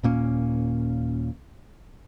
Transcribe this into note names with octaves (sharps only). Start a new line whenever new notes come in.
D#1 A#2 A#3 C#4